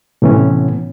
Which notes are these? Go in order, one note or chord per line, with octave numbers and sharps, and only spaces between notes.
A2 C3 E3 B3 C#4